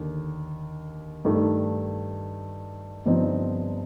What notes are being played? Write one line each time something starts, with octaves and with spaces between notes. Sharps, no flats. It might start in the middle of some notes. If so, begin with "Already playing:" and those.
Already playing: D#2 D3
G2 D#3 A3
G1 G2 F3 C4 D#4